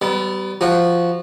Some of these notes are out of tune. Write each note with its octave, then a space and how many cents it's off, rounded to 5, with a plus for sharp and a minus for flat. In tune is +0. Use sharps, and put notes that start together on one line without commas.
G3 -35 B3 +20
F3 -10 F#4 +0